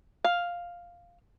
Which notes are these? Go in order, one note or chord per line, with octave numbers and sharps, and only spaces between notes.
F5